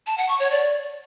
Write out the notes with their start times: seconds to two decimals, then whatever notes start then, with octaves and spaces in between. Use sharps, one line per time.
0.07 A5
0.18 F#5
0.29 C#6
0.40 C#5
0.51 D5